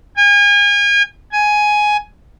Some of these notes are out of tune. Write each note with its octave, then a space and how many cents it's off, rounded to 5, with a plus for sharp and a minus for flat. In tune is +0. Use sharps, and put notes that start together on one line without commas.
G#5 -35
G#5 +10